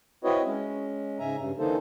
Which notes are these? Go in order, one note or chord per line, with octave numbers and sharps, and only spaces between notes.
C4 E4 F#4 B4 C#5 D#5
G#3 C#4
G#2 C#3 E5 G#5 A#5
G2 C#3
D3 E3 A#3 D#4 A4 C5